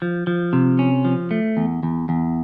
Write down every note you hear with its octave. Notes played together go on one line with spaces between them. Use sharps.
F3
F3
C3
C#4
F3
A3
E2
E2
E2